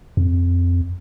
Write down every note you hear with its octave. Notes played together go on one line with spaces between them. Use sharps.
F2